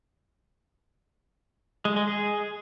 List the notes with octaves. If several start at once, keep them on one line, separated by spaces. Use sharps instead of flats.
G#3
G#3
G#4